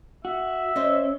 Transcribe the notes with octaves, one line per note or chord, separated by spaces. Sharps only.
F#4 E5
F#2 C4 C#4 D#5